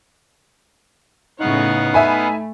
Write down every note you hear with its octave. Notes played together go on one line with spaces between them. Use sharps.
A2 C#3 B3 D#4 C#5 F5 F#5
A3 E5 G#5 B5